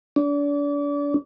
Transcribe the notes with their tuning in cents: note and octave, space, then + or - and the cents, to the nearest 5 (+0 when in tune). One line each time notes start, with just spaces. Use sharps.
D4 -35